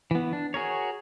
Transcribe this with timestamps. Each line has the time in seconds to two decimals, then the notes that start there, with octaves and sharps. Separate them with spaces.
0.11 E3 B3
0.33 D4
0.54 F#4 G#4 A#4 C#5